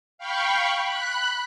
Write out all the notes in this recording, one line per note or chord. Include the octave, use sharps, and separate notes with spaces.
F5 G5 B5 C#6
B5 F#6